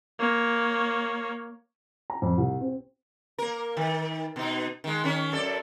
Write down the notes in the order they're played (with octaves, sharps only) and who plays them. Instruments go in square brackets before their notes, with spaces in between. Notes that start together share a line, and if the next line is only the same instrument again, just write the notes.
[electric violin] A#3 C#5
[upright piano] A#5
F2
C2
C4
[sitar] A#3 A#4
D#3
B2 D#4
D#3 G#3
D#3 C#4
F#2 A4 D5